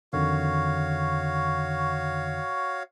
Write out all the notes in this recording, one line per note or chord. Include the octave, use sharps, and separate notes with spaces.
F2 D3 D#3 F#4 C#5 F5